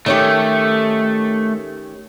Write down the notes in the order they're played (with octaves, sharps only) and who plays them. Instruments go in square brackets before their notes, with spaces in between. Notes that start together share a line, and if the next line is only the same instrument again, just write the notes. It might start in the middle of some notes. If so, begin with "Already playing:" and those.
[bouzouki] D#3 C#4 G4 [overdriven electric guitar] A3